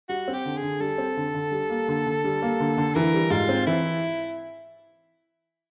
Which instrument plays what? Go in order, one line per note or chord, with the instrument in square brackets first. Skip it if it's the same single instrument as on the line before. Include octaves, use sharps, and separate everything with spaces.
[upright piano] G3 [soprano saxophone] F#4
[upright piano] C4
[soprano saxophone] G4
[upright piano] D3
[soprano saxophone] G#4
[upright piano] D3
[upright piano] G3 [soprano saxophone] A4
[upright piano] C4
D3
D3
G3
A#3
D3
D3
G3
A#3
D3
D3
[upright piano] E3 [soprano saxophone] A#4
[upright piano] G3
[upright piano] G#2 [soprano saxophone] F4
[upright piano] C4
[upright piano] E3 [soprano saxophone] E4